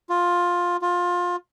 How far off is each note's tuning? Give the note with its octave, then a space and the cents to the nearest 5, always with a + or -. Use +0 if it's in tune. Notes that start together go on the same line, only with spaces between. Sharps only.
F4 +10
F4 +20